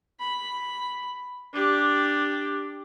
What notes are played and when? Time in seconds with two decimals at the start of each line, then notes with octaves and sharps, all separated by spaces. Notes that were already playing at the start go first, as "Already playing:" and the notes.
0.20 B5
1.53 D4 G4